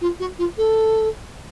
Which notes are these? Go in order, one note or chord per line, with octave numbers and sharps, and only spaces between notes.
F4
F#4
F4
A4